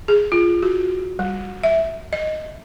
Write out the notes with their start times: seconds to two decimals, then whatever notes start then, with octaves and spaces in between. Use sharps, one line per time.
0.08 G#4
0.32 F4
0.63 F#4
1.19 G3
1.63 E5
2.13 D#5